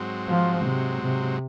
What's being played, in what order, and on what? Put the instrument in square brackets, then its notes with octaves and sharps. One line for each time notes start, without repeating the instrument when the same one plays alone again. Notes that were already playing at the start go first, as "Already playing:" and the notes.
Already playing: [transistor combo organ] G#2 F#3 C4
[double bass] F3
C3
C3